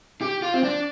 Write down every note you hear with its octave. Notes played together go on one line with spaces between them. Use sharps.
G4
F4
C4
D4